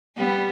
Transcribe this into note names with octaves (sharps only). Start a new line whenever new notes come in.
G3 B3